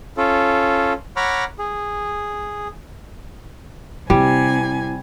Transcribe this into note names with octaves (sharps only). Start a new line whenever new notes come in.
C#4 F4 A4
C#5 F#5 A#5 B5 D6 F6
G#4
C3 G3 E4 G#5